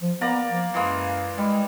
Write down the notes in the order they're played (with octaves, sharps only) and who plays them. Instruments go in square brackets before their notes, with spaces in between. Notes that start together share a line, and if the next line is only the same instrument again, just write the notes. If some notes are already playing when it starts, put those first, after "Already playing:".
[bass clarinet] F3
[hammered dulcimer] A#3 D5 A#5 [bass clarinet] B3
[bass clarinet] F3
[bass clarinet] F#2 [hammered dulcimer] E3 G#3 A#3
[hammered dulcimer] G3 [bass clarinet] G#3